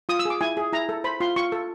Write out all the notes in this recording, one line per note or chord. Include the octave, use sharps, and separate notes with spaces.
F4 D#6
E6
G#4 D6
E4 G#5
G#4
E4 A#5
A4
C5 B5
F4 C6
F4 C#6
A4